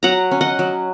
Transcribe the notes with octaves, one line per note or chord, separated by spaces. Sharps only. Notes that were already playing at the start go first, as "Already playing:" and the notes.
F#3 F#5 A#5
C#4
D#5 F#5
F#3